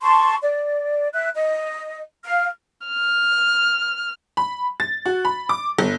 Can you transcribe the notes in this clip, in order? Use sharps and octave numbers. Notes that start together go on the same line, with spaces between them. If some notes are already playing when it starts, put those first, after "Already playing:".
A5 C6 C#6
D5
E5 F#6
D#5
F5 F6
F6
B5
A6
F#4
B5
D6
G1